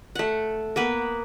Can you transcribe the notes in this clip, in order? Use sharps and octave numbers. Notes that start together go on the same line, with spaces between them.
A3 F#5
A#3 B3 B4